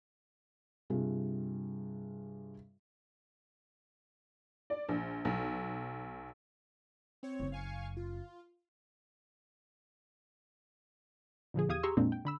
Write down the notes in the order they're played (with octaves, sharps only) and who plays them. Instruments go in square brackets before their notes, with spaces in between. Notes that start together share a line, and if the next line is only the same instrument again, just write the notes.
[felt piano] G2 C3 F4 G#4
[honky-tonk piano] D5
A#1
B1
[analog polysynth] C4 C#5
[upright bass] F#1 F#2
[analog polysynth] F5 G#5 C#6
F4
[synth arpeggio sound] A#2 D3 F3 G#4
E2 G4 F5 D#6 G#6 D#7
G4 G#4 A#5 C6 C#6 E6
F2 A#2 G#3 A#3 C4 D4
G5
D3 B5 E6